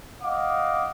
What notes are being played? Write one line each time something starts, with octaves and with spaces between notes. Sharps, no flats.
D#5 F5 F#5 D6